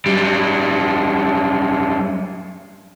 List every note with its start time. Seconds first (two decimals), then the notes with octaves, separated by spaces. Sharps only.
0.06 F#2 G3